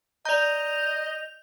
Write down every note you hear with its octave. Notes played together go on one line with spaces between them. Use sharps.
D5 D#5 A#5 G6 F7